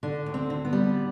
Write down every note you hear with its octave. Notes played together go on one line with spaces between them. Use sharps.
D3 D4
D2
C4
D3
B3
G3